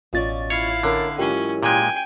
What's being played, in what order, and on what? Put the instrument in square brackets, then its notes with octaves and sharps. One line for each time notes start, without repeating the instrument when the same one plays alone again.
[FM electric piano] A1 F4 A6 [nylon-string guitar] B2 C#4 D5
[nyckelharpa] E4 F5 [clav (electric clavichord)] C#5
[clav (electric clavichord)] D3 [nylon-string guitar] C#4 A#4
[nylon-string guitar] G#2 E3 F#3 [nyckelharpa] C#4 [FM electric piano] F4 G4 A#4
[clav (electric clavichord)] A#2 G#3 [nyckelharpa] G5 G#5